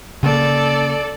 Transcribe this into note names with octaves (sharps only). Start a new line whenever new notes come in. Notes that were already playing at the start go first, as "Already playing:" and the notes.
C#3 A#3 A4 D5